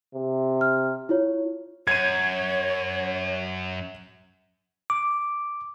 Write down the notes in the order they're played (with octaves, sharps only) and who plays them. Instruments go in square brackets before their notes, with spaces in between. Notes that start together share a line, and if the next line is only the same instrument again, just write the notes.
[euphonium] C3
[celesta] F6
E4 F4 C#5
[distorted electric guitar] F#2 [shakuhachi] C#5 [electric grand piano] G#6 D#7
[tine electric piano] D6